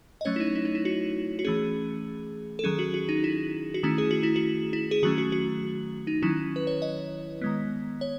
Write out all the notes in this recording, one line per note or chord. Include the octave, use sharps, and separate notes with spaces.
D#5
F#3 A3 C#4 C#5
E4
D#4
E4
D#4
E4
F#4
F#4
E3 A3 C#4 G#4
A4
D#3 F#3 C#4 G#4
F#4
F#4
D#4
E4
F#4
D#3 A3 C#4 E4
G#4
F#4
E4
F#4
E4
G#4
D#3 F#3 A3 C#4 F#4
F#4
F#4
D#4
D#3 F#3 C#4 E4
B4
C#5
D#5
D#3 G#3 B3
C#5